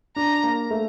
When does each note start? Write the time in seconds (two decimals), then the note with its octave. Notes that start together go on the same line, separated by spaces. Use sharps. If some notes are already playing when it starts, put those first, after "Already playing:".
0.16 D4 A#5
0.43 A#3
0.71 A3